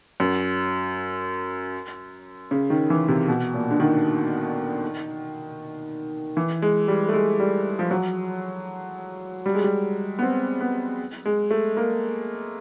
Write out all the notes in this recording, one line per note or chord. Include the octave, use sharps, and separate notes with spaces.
F#2
C#3
D#3
E3
C3
B2
A#2
D3
D#3
E3
G#3
G3
A3
G#3
G3
F3
F#3
G3
G#3
G3
B3
C4
B3
G#3
A3
A#3